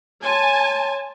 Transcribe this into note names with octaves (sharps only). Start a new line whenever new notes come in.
C#5 G#5 A5 C6